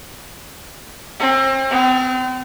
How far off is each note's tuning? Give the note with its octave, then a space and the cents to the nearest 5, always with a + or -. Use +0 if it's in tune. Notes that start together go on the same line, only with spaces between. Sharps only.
C4 +35
C4 -40